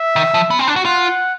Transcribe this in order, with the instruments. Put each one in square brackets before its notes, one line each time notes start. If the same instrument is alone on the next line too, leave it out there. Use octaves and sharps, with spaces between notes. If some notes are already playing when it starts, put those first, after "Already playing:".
Already playing: [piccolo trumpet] E5
[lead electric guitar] D#3
F3
B3
C4
D4
F#4
[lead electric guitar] F4 [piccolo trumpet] F#5